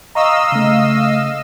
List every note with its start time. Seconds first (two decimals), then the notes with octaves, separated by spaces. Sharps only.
0.15 D#5 F5 A#5 C#6 D#6 E6
0.52 C#3 A3